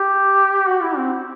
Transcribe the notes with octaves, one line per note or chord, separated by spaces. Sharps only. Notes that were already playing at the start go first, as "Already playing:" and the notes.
Already playing: G4
F#4
E4
C4